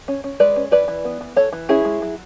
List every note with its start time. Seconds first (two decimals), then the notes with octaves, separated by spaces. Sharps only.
0.08 C#4
0.24 C#4
0.40 G#3 B4 D5
0.56 C#4
0.71 E3 B4 D5
0.88 E3
1.05 B3
1.21 E3
1.36 E3 A4 C#5
1.53 E3
1.69 C#4 E4 G#4
1.85 G#3
2.02 F#3